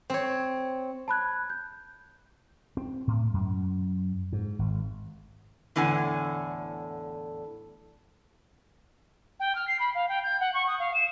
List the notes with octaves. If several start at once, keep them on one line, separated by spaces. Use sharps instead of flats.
C4 C#5
A5 B5 F#6 G#6
G6
C4
A2
F#2
G#2
G#1
E2 A2 D3 F#5 G#5
G5
F6
C7
B5
F5
G5
G6
F#5
C#6
D#6
F5
E7